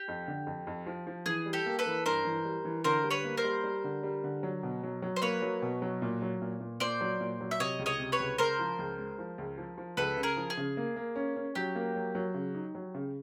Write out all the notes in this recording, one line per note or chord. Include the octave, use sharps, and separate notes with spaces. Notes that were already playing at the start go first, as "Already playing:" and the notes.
Already playing: G4
F2
D3
F2
F2
F3
F3
E3 G#4
G3
G4 A4
A#3
A4 B4
E3
G2 A#4 C5
E3
G3
E3
D3 A#4 C5
G3
B4 C#5
A#3
A#4 C5
G3
G3
D3
G3
D3
F#3
B2
F#3
F#3
C5
A#3 B4 C#5
F#3
B2
F#3
A#2
F#3
A#2
A#2
A#2 C5 D5
F#3
A#2
F#3
E5
C3 C#5 D#5
C#2
C#5 D#5
C3
B4 C#5
C#2
C#2 A#4 C5
F3
C#2
G#3
F3
C#2
F3
F3
C#2 A4 B4
C#3
G#4 A#4
F3
G#4
C#3
A#3
A#3
C#4
C#4
F#3 G4
A#3
F#3
F#3
C#3
D#4
F#3
C#3